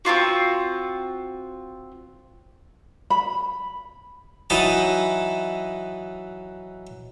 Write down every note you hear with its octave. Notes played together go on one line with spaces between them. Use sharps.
C4 D4 F4 F#4
B5
E3 F#3 D#4 E4 D#5 A5